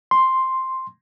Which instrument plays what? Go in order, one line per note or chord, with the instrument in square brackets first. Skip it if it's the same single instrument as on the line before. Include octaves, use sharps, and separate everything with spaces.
[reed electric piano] C6